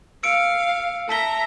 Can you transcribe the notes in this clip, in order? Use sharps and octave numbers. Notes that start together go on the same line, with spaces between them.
F5 E6 C#7 D7
E5 A5 A#5 B6 G7